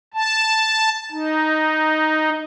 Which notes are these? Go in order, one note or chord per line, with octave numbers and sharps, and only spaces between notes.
A5
D#4